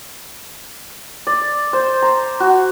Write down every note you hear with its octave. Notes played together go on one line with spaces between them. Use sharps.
D5
C5
A#5
F#4